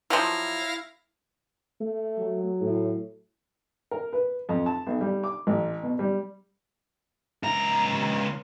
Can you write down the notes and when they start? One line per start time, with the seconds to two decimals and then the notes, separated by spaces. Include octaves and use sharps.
0.10 F3 F#3 E4 F5 A#6
1.81 A3
2.19 F#3
2.61 A2
3.91 A#4
4.13 B4
4.49 F2
4.66 A5
4.87 B1
5.01 G3
5.24 D6
5.47 A1
5.83 B2
5.99 G3
7.43 C#2 A#5